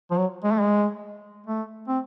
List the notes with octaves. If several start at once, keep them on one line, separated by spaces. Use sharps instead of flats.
F3
F#3
G#3
A3
G#3
A3
C4